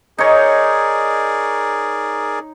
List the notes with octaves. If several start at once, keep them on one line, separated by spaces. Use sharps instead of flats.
D#4 G#4 A#4 C#5 D5